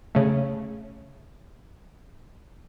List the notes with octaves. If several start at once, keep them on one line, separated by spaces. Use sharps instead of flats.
C#3 A3